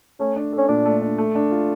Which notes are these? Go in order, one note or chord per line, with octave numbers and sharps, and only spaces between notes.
A3 C#4
D4
A4
C#4
A#2 D4
A3
D4
A3
D4
F4